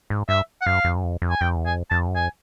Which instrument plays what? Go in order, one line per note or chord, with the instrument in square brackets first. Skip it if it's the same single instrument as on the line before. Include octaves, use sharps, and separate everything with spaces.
[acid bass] G#2
[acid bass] G2 [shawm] E5
[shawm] F#5
[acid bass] F#2 [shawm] F5
[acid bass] F2
F#2
F2
F2
[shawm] G#5
[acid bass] F2 [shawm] G5
[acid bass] E2
[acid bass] F2 [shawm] G#5
[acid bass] F2 [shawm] A5
[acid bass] F#2
[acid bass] F2 [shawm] G#5